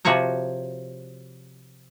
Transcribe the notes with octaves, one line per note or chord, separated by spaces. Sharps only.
C3 F3 F#4 C#5 A#5